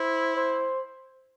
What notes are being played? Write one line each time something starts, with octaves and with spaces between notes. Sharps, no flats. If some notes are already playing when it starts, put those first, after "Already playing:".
Already playing: E4 C5
C5